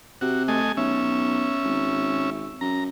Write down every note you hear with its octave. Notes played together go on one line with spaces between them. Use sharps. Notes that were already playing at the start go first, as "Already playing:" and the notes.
C3 F#4
A3 D#5 G#5
B1 C#4 E5
G#1
F#2 A#5